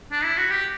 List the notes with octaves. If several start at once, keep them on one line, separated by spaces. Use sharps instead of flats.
D4
E4
F#4
G4